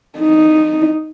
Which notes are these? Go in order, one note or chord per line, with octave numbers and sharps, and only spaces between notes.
D#4